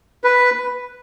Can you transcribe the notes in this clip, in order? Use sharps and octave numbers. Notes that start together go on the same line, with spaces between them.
B4